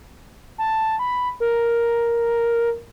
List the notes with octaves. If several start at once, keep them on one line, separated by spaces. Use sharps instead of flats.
A5
B5
A#4